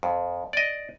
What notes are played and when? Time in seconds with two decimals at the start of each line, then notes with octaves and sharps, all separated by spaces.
0.03 F2
0.53 D5 D#5